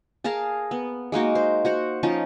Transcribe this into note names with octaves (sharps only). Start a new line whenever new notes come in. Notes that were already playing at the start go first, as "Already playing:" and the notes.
G#4 A#4 F5 A5
B3
G#3 A#3 D#4 F#4
C5
F#4 C5 F#5
F3 C#4 D#4 A5